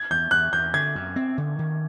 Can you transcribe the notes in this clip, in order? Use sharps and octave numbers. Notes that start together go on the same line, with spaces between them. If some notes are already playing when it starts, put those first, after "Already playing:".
Already playing: G#6
E2 G6
E2 F#6
E2 G6
D3 G#6
F#2
C4
D3
D#3